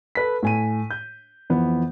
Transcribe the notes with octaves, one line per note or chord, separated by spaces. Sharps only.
A4 B4 B6
A2 G#5 D#7
G6
F2 E3 B3